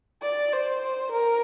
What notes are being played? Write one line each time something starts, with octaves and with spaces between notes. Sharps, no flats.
D5
C5
A#4